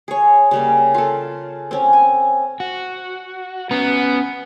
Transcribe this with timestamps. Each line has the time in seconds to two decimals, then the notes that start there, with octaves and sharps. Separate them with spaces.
0.08 G#4 C#5
0.51 C#3 G3 A#3
0.94 F4 A4
1.71 C4 C#4
1.93 G#5
2.60 F#4
3.71 B3 C#4 A#5